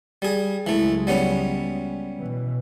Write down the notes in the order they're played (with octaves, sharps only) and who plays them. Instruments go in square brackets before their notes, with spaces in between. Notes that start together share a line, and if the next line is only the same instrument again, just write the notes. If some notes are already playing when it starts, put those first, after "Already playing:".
[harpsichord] G3 G#4
[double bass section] C#2 F#3 G#3 [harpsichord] E3 A3
[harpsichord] G3 B3 C#4
[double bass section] B2 E3